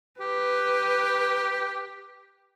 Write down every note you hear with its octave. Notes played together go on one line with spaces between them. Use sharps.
G4 B4